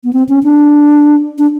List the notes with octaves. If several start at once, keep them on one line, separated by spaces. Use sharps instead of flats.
B3
C4
C#4
D4
D4